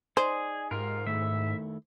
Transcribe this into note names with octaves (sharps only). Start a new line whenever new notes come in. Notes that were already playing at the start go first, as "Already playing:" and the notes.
D#4 G#4 C5 D5
G#2 F4 G4 G#4 A#4
D#3 A3 E4 E5